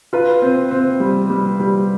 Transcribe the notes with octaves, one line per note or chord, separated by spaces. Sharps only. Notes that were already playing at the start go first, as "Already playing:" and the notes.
F4 B4
C4
C4
G3
G3
G3